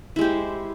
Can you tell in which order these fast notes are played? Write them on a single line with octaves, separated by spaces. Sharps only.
E4 G#3 G4 C5